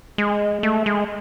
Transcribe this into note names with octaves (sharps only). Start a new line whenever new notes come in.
G#3
A3
G#3